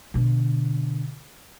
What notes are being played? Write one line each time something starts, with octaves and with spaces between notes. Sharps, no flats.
B2 D3